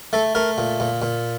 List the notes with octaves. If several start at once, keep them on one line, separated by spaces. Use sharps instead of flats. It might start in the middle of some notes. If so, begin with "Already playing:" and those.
A3 A4
A3 A#4
A#2
A#2
A#2